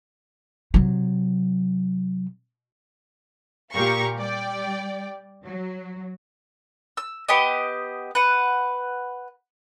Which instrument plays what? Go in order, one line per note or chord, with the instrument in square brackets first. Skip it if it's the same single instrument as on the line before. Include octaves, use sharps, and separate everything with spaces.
[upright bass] C3 F#3
[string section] A#2 G4 A#4 F5 A#5 C#6
G3 D5 G5
F#3
[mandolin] E6
B3 G4 D#5
B4 F#5